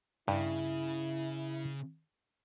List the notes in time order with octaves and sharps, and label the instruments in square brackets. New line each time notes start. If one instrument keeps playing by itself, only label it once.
[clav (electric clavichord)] G2 [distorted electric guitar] C#3 [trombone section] E4